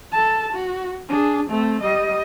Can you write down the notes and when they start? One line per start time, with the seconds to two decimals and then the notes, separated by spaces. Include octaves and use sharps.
0.13 A4 A5
0.53 F#4
1.08 D4 G#4
1.50 A3 C4
1.82 G3 D#5